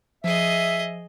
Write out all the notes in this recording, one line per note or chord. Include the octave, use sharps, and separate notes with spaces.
F3 G#4 D#5 E5